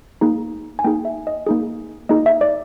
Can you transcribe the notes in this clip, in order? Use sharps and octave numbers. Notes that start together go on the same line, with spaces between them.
A#3 D#4 G#4
G#5
A#3 D#4 G#4 G5
E5
D#5
A#3 D#4 G#4
A#3 D#4 G#4 D#5
E5
D5